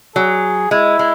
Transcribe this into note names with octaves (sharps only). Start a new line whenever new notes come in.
F#3 G#4
G#3 E4
G#3